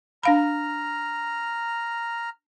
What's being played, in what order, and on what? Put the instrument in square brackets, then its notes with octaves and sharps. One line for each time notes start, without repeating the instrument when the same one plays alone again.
[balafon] D4 F5 B5 [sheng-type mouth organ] A#5 F6